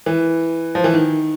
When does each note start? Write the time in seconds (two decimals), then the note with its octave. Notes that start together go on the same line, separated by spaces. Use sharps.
0.06 E3
0.75 F3
0.84 E3
0.94 D#3